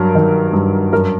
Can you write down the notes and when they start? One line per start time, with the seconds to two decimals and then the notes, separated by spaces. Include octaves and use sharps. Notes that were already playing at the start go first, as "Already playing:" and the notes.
Already playing: G2 F#3 A#4
0.15 D#3
0.53 G2
0.93 F#2 A#4